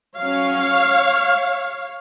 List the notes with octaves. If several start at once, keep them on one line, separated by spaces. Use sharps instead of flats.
F#3 C#4 C#5 F5